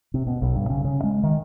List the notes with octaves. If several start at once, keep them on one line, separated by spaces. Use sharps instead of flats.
C3
B2
B1
G2
C#3
C#3
G#3
D#3